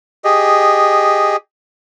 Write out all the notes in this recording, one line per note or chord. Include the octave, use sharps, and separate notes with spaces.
G4 G#4 D#5